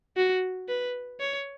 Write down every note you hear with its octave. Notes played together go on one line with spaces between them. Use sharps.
F#4
B4
C#5